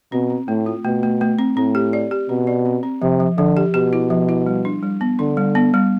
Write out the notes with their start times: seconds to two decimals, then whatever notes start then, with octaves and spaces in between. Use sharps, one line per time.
0.12 B2 C4
0.30 C4
0.48 A2 A3
0.66 F4
0.84 B2 A3
1.03 A3
1.21 A3
1.39 C4
1.56 A2 C4
1.75 G4
1.93 D5
2.11 G4
2.29 B2 C4
2.47 D5
2.66 C4
2.83 C4
3.02 C3 F3
3.20 F3
3.38 D3 F3
3.57 G4
3.74 B2 G4
3.93 E4
4.10 F3
4.29 E4
4.46 G3
4.65 D4
4.83 G3
5.01 B3
5.19 D3 D4
5.37 G3
5.55 B3
5.74 G3